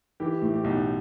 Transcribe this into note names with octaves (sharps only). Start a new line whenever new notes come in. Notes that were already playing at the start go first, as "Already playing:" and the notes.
E3 G4
A2
G4
B1